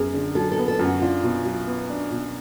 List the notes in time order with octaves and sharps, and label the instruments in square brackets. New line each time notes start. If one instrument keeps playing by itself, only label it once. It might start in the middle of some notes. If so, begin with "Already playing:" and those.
Already playing: [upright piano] F#2 B3 [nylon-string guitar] G#4
[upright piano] D3
[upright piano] F#3 [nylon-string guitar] A4
[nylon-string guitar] A4
[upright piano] B3
[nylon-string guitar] A4
[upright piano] F#2
[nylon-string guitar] F#4
[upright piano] D4 [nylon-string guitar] F4
[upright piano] B2
F#3
B3
D4
B2